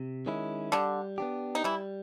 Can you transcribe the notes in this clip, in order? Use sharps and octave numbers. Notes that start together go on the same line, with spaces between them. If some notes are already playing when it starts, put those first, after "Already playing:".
Already playing: C3
D#3 G#3 C#4 E4
D3 G3 D4
B3 D4 G4
D#4
E3 G3 E4